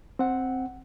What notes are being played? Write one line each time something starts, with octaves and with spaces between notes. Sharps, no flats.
C4 F#5